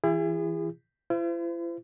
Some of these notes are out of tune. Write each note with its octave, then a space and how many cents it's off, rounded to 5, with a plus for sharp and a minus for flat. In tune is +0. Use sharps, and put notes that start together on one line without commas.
E3 +0 E4 +30 G#4 -35
E4 +45 C5 -35